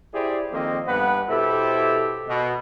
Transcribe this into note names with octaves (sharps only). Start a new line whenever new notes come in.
E4 G4 G#4 C5 D5
D#3 F3 A#3 C4 A4 D#5
G2 B3 B4 F#5
B2 E4 G4 A4 C5 E5
B2